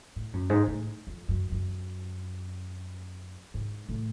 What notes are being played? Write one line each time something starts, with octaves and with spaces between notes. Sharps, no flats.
A2
F#2
G#2
A2
F2
F#2
F#2
G#2
A2